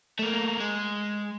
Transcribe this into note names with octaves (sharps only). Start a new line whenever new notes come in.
A3 A#3
G#3